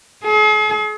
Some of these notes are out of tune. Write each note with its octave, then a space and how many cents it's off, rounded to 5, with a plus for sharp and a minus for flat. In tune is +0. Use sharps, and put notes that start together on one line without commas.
G#4 +45